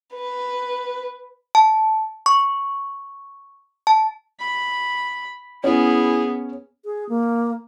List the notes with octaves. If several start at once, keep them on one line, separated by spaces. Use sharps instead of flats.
B4
A5
C#6
A5
B5
B3 C#4 E4 G#4
G#4
A#3